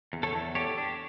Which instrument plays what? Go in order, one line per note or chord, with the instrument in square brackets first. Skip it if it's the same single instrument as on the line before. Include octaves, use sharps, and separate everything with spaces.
[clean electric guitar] E2
[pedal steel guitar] A4 C#5
[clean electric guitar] E2
[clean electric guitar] G4 [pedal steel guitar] A4 C#5
[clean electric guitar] D4